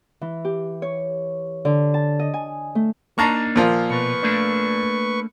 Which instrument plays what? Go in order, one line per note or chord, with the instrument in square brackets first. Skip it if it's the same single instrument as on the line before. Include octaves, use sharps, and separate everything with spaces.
[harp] E3
G4
C#5
D3
A5
D#5
G#5
A3
[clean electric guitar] A#3 D4 D#4 [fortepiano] A5 A#5 C#6
[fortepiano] A#2 F3 F4
[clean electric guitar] B2 [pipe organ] B4 C#6
[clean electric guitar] A3 A#3 D4